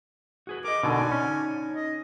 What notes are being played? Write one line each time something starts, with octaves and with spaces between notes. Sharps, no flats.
F#4 G#4 B4
A#4 D#5 D6
B2 D3 D#4 D5 G#5
C#4
D#5